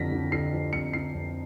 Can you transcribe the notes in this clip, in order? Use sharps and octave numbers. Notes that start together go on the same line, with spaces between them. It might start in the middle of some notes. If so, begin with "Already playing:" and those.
Already playing: F2 D3 F3 A#6 B6
D3
D3 C7
F3
F2 C#7
D3 C7
F2